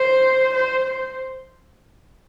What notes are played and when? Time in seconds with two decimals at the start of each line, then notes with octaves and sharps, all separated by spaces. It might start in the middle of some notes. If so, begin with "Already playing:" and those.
Already playing: C5
0.53 C5
0.84 C5